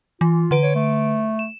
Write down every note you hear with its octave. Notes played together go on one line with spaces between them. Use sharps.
E3 F4
D3 B4 D7
C#5
A3
E7